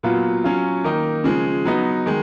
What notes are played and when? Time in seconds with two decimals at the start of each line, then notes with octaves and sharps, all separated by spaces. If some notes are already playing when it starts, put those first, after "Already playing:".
0.03 A#2 F#3 B3 F4
0.44 F#3 C#4 F4
0.84 D#3 A#3 D#4
1.24 C#3 F3 G#3
1.65 F#3 B3 D#4
2.06 D#3 G#3